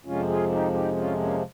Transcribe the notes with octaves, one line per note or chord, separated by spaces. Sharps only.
F2 C3 F3 G#3 C#4 F4
F4 G#4
D#4 G4
D#4 G4
C#4 F4
A#3 C#4